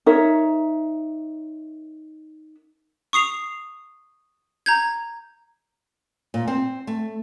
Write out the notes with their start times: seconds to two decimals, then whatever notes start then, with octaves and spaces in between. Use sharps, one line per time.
0.06 D#4 A#4 C#5 E5
3.13 C#6 D#6 C7 F7
4.66 A#5 G6 G#6
6.34 A#2
6.48 C4
6.87 A3